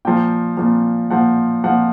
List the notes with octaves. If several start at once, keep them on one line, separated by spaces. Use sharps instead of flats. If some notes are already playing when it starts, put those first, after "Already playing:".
A#2 F3 G5
A#2 F3
A#2 F3 F#5
A#2 F3 F#5